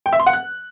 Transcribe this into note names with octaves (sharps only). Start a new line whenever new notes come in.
G5
E5
C6
F#5
F#6